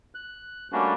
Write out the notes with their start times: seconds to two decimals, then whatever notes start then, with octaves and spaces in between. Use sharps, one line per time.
0.15 F#6
0.73 G3 A3 A#3 C#4 D4 F#4